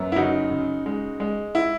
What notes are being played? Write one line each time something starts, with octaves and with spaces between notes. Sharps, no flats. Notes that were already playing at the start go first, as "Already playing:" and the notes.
Already playing: F#2 B3
E4
C#3 D#4 F#4
C#3
G#3
G#3
E4